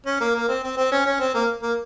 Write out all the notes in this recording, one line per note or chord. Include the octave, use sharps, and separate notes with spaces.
C#4
A#3
A#3
C4
C4
C4
C#4
C#4
C4
A#3
A#3